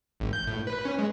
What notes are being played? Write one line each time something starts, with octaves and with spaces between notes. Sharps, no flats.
G#1
G6
A2
B4
C#4
G#3